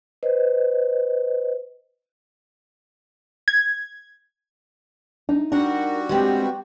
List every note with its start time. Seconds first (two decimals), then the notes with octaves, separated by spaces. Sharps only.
0.23 B4 C5 D#5
3.48 G#6
5.29 D4 D#4
5.52 G3 D4 F#4 A#4 F#5
6.09 G#3 B3 C4 G4 G5